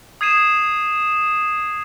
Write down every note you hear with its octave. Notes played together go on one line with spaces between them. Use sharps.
D#6 G#6 C7 D#7 E7